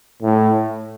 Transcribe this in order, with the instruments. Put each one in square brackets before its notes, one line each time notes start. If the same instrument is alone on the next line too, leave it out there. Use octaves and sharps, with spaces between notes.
[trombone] A2